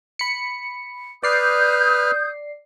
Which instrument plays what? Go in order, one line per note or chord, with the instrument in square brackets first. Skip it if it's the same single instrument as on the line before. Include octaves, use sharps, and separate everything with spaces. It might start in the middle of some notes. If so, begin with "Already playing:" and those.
[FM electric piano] B5 C#7
[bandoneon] B4 F6 [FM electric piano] D5 C7 [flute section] D#6 G6